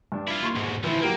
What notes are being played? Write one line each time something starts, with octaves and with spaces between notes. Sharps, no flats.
G2 D4
E4 F4
D#2 C6 C#6
B1 G#2
D2 E3 F3 E4
F#3 A#3 G4 A#4